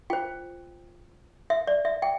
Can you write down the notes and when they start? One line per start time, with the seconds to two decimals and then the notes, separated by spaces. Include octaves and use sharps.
0.10 F4 C5 G5
1.50 E5
1.67 D5
1.85 E5
2.02 G5